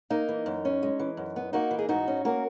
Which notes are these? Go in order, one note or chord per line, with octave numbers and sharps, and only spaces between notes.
A#3 D#4
E3
F#2
C#4
G#3
E3
F#2
B3
A#3 D#4 F#4
E3
G#4
G#2 D#4 F#4
C#4
A#3 F#4 A#4